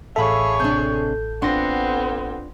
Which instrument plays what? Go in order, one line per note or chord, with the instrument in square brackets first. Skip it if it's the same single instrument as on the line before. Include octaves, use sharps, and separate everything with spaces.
[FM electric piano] A1 A4 [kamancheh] G#4 C#5 [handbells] E5 F5 B5
[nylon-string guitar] C3 D4 [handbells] G6
[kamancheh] B3 C4 [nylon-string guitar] D4 F4 [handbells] F#5 C6 A#6